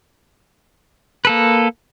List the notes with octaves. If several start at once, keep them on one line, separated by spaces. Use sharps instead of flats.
A#3 A4 B4